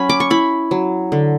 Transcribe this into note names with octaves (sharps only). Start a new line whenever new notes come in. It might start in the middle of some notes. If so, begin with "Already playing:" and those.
Already playing: F#3 C#4 B5
D6
C#6
E4 B5
F#3
D3